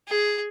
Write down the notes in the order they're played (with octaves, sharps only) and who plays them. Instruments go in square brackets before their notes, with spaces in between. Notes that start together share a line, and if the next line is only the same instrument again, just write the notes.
[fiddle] G#4